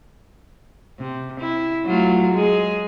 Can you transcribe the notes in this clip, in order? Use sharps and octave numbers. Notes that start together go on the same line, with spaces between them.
C3
E4
F#3 A3 F4
G#3 G#4